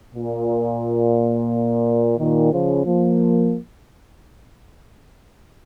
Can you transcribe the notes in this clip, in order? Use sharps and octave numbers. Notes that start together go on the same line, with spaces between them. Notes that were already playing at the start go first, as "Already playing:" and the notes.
A#2
A#2 D#3
C#3 F3
F3 A#3